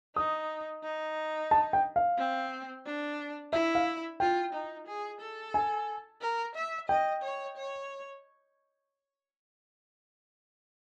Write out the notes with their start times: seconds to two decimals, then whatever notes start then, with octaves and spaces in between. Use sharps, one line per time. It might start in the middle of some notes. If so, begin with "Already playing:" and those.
0.16 D#4 D#6
0.83 D#4
1.51 A5
1.73 G5
1.96 F5
2.18 C4
2.85 D4
3.52 E4 E5
3.75 F5
4.20 F4 G5
4.53 D#4
4.87 G#4
5.20 A4
5.54 G#5
6.21 A#4
6.55 E5
6.89 D#5 G5
7.23 C#5
7.57 C#5